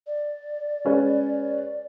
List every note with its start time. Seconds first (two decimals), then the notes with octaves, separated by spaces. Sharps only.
0.07 D5
0.85 G#3 C#4 B4